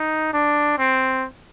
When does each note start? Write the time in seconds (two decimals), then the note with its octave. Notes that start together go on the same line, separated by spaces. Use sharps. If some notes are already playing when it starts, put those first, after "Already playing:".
Already playing: D#4
0.33 D4
0.78 C4